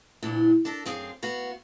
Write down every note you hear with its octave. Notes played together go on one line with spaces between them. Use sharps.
D2 A#2 E3 D4
D4 A4 A#4
F#2 C4 G#4 F5
B3 F#4 F5